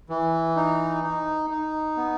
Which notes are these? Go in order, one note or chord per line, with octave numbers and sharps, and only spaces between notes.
E3
D#4
D#4
D#4
B3